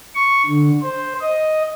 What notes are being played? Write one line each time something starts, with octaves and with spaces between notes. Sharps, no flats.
C#6
D3
C5
D#5